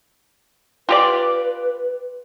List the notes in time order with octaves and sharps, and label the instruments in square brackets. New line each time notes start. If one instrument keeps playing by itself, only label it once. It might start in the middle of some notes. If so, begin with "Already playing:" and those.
[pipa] F4 G4 D5 [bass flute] B4